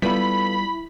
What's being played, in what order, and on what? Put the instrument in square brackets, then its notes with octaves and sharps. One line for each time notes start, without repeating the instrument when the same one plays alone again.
[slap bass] G3 [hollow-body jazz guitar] B3 F4 A4 [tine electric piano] E4 [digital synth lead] B5